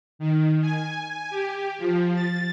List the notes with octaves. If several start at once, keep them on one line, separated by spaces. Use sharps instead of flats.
D#3
G#5
G4
F3
A6